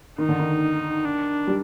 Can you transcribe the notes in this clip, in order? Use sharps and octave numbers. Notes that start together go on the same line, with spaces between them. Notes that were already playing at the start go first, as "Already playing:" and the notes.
D#3 D#4
D3
D#3
D4
G3